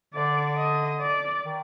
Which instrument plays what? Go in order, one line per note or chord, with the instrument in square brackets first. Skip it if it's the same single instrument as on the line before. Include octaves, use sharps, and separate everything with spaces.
[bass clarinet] D3 [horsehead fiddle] D5
[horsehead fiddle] D#5
D5
[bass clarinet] D#3